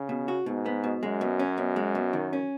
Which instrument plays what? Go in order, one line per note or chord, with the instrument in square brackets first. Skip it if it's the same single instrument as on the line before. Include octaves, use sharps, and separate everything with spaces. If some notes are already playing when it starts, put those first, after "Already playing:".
Already playing: [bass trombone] C#3
[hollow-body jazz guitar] B2
F#4
[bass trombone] G#2 [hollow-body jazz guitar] B2
[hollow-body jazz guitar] B3
B2
[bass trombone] F#2 [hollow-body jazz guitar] G#3
[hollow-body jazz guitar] B2
C#4
B2
G#3
B2
D#3
C#4